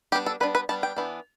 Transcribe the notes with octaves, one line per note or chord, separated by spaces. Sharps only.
G3 B3 D4 G4
A4
G3 B3 D4 B4
B4
G3 B3 D4 A5
G5
E3 B3 D4